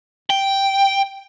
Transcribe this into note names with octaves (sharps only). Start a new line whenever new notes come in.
G5